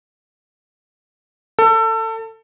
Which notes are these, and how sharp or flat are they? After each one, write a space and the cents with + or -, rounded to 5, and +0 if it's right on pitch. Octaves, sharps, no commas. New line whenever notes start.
A4 +25